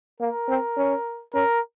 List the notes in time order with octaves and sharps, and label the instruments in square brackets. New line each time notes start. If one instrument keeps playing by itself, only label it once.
[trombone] A#3 [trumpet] A#4
[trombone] C4
C#4
[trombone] C#4 [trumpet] A#4